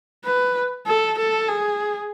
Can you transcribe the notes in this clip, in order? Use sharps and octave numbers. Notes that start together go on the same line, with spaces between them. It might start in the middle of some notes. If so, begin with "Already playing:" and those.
B4
A4
A4
G#4